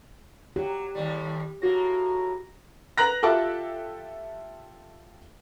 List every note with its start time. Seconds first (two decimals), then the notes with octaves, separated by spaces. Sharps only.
0.56 F#3 G4
0.95 D#2 A2 G3
1.62 A2 A#3 F#4 A#6
2.98 B4 A#5 F#6 A#6
3.22 F4 G4 A4 E5 A5 D6